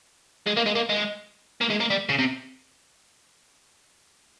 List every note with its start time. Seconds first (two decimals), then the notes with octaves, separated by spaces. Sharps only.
0.47 G#3
0.57 A#3
0.66 G#3
0.75 A#3
0.90 G#3
1.61 A#3
1.70 G#3
1.80 A#3
1.90 G3
2.09 C#3
2.19 C3